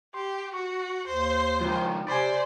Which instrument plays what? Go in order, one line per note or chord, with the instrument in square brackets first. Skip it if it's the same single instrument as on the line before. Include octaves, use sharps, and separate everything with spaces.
[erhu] G4 [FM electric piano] C6
[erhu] F#4 [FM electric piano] C#6
[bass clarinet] D#2 [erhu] C5
[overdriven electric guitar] C#2 D#3 [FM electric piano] F3
[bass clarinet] C3 [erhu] C5 [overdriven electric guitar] D5 [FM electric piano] G#5 B5